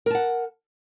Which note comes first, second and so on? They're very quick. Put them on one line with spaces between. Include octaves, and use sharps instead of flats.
A#4 A5 F#5